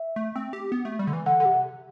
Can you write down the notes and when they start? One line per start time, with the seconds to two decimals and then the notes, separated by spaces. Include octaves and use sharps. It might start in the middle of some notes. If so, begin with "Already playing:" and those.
Already playing: E5
0.16 A3
0.36 C4
0.53 G4
0.72 B3
0.85 A3
0.99 G3
1.07 D3
1.13 E3
1.26 D3 F#5
1.40 D3
1.45 C3